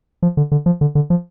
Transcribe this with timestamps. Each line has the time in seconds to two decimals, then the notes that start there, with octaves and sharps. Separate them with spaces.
0.22 F3
0.37 D3
0.52 D3
0.66 F3
0.81 D3
0.95 D3
1.10 F3